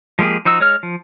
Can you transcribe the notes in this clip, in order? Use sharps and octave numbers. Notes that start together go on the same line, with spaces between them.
F3 G#3 A#3 G4 G#4
F3 D#4 F#4 E6
G#3 C#5 F6
F3